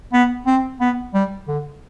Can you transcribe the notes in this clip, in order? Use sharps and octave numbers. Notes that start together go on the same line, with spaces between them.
B3
C4
B3
G3
D3